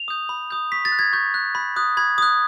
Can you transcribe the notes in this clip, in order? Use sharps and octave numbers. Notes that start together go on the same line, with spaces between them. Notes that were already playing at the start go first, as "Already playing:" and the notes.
Already playing: F7
D#6 G6
B5
D#6 G6
C#6 B6
A6
F#6
G#6
C#6 G6
F#6
B5
D#6 F#6
B5 G#6
D#6 F#6